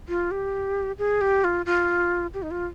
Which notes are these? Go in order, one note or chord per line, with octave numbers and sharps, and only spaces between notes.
F4
G4
G#4
G4
F4
F4
G4
D#4
F4